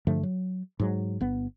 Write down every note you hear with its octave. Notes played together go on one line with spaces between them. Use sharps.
G2 D3 F3 A3
F#3
G#2 F#3
G1 B3